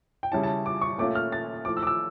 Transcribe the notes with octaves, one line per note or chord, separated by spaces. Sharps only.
G5
C#3 G3 C#4 E4 A5
A5
D6
C#6
A#2 A3 C#4 F4 D6
F6
A6
F3 A3 E4 D6
E6
D6
E6